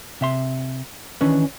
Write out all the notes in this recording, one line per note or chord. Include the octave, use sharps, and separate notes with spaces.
C3 E5 C6
D#3 E3 C#4 D4 B4